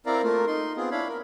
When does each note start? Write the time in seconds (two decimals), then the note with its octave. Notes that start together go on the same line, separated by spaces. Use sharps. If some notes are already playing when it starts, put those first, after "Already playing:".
0.06 C4 E4 A#4 D5 F5 A#5
0.23 A3 A#3 F4 A#4
0.47 D#4 C6
0.77 B3 C4 F4 G#4
0.91 D4 E4 C#5 F5 B5
1.08 A#4